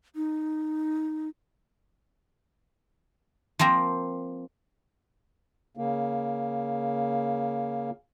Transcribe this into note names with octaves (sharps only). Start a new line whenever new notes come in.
D#4
F3 A#3 C4 A#5
C#3 A#3